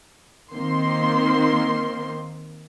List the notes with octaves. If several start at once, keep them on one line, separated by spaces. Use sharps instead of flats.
D#3 A#3 C4 C6